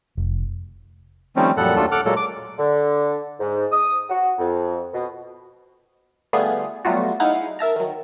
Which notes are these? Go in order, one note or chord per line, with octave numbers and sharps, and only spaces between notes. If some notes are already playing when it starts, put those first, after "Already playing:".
F1
D#3 F3 G3 A3 C4 C#4
F#2 A#2 F3 G3 A4 F#5
D#2 F#3 A3 D4 F4 A4
A4 F#5 D6 F6
A#2 F#3 G#3 A#3 A4
D6
D3
G#2
D#6
F#4
F2
B2
D3 G3 A3 B3 F4 G#4
F#3 G3 A3 B3 F4 F#4
D#4 E4 G#4 F5 F#5
A#4 E5 A5 A#5
D#3 F#3